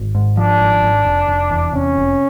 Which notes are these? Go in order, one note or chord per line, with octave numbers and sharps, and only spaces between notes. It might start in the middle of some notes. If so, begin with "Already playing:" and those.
Already playing: G#1
G#2
F3 D4
G#1
G#1
F1
F1
E2
C3 C#4
F1